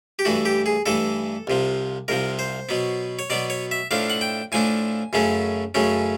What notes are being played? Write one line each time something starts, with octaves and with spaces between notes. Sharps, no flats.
G4
G2 E3 A3 F#4
G4
G#4
G2 E3 A3 A4
C2 C3 F3
C2 C3 F3 A#4
C5
B2 F#3 B3
C#5
B2 F#3 B3 D5
C#5
E5
A2 F3 A3 D4 F5
F#5
G5
A2 F3 A3 D4 G#5
F#2 C#3 F#3 A3 C#4
F#2 C#3 F#3 A3 C#4